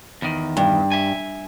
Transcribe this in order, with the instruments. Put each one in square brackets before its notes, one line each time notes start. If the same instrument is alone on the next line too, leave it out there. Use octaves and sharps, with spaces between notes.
[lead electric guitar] E2 D#3
[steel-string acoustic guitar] G2
[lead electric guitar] E5 G#5